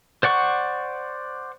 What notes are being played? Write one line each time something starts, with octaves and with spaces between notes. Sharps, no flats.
C5 D5 F#5 C#6